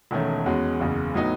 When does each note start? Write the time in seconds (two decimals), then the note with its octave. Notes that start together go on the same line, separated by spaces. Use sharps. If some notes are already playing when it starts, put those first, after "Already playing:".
0.11 E1 E2 D#3 A3 C#4
0.46 E2 B2 G#3 C#4
0.80 F#1 E2 C#3
1.14 A2 F#3 B3 D#4